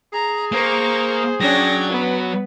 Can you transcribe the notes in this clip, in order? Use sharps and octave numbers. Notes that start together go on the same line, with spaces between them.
G#4 A#5
A#3 C5 A#5 C#6
F#3 C#4 D4 G5 G#6 A#6
B3 B4